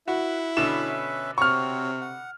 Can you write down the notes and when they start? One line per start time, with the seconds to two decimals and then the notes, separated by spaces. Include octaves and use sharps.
0.08 E4 F#4 B4
0.57 B2 D3 C#4 B4 E5 E7
1.38 C3 C4 F#4 C#5 C#6 F6
2.01 F#5